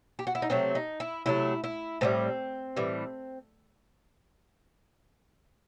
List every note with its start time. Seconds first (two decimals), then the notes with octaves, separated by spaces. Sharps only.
0.19 G4
0.27 F#4
0.35 E4
0.42 D#4
0.50 C3 F#3 A3 C4
0.75 D#4
1.00 E4
1.26 C3 F#3 A3 E4
1.64 E4
2.01 A2 E3 G3 C4
2.76 A2 E3 G3